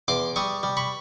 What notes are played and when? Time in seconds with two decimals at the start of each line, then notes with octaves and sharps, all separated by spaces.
0.08 E2 C6 D6
0.36 G3 C#6 D#6
0.63 G3
0.77 B5 C#6